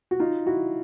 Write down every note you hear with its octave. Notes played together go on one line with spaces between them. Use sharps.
F#4
D#4 F4
E4 F#4